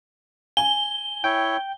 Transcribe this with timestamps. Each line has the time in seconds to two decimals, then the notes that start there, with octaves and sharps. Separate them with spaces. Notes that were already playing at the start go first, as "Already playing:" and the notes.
0.57 G#5 G7
1.24 E4 C#5 G5